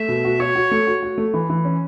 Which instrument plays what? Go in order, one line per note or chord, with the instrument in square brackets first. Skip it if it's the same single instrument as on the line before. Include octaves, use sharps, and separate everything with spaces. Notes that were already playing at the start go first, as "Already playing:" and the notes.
Already playing: [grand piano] A3 [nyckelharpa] E5
[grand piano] B2
F#4
[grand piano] F#4 [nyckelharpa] C#5
[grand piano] F#4
A3
F#4
F#4
A3
E3
E3
C#4